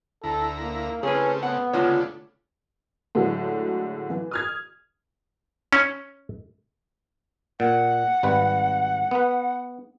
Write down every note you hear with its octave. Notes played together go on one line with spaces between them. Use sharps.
D2 E4 A4 A#5
A#3
C#3 A3 C4 C#4 G#4 B4
B3 F#5
D2 C#3 A3 D4 F4 C#5
A2 D3 F#3 G#3 A3
E3
D#6 F6 G#6
C#4
A#2 F#5
G#1 G3 B4
B3 B4